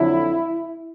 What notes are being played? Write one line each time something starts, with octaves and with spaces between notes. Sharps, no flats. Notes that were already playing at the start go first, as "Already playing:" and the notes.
Already playing: F2 D3 F#3 E4